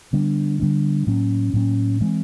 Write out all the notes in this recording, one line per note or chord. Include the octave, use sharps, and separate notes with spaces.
D3 G3 B3 D4
D3 G3 B3 D4
A2 F#3 A#3 C#4
A2 F#3 A#3 C#4
E3 G#3 C4